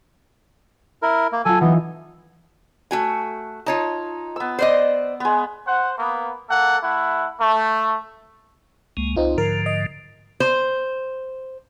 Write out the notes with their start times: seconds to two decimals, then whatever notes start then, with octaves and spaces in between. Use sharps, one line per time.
1.02 E4 A#4
1.32 A#3
1.45 F#3 F4 A4 G#5
1.61 E3 B3 D#4
2.91 A3 F#4 G#5
3.66 D#4 F4 C#5 A5
4.36 B3 E6
4.59 C5 D5 D#5
5.20 G#3 B3
5.66 C5 F#5
5.98 A#3 B3
6.50 A#3 A4 F#5
6.83 A3 E4 F#5
7.39 A3
8.97 C#2 G#3 A#3
9.16 C2 C4 D#4 F4
9.38 G#2 D3 F3 A#4
9.66 D#5
10.40 C5